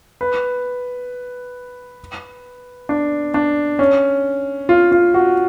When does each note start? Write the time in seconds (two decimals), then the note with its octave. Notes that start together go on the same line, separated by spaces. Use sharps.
0.21 B4
2.89 D4
3.34 D4
3.79 C#4
4.69 F4
4.92 F4
5.14 F#4